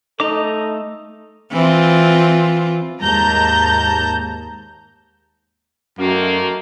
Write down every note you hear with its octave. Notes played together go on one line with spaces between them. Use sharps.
A3 D#4 A4 D#5 A#5 D6
E3 C4 F4
D#2 G#2 A5 A#5 G6
F#2 D#3 A3 A#3